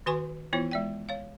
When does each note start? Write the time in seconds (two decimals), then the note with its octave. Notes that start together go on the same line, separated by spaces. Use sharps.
0.06 D#3 F#4 B4 G#5 C6 C#6
0.53 E3 B3 E4 F4 C#5
0.71 G#3 D5 G5
1.09 C#5 F5